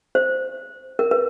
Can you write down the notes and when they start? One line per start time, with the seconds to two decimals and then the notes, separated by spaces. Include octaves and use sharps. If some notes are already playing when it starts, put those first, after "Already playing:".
0.15 C5
0.99 A#4
1.11 B4